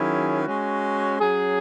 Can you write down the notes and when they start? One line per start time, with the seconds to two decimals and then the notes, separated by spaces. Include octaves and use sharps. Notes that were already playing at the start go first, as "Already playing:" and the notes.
Already playing: D#3 F#3 C#4 E4 G#4
0.43 G#3 C#4 F#4
1.20 F#3 C#4 G#4